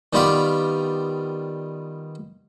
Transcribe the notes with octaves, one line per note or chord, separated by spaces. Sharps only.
D#3 G3 B3 F4 D5